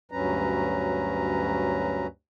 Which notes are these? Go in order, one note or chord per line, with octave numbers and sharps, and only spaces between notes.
D2 G2 F#3 C#4 B4 A#5